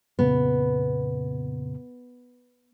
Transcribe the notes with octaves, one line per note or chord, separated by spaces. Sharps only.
F2 A#2 C#3 B3